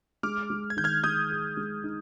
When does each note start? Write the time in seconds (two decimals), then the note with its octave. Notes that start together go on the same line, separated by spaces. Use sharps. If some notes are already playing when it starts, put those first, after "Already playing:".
0.23 G#3 D6 F6
0.50 G#3
0.70 G#6
0.77 D#3 G6
0.84 F6 G#6
1.04 G#3 D#6 G6
1.30 G#4
1.57 G#3
1.84 D#4